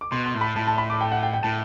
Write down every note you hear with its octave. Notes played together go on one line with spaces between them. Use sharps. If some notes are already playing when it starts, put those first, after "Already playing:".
D6
B2 C6
C6
A2
B5
A2 A5
A5
B5
D6
G5
F#5
G5
G5
A2 A5